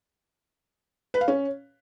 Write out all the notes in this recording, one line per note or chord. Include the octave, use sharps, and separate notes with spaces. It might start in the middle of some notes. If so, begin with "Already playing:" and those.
B4
F5
C#4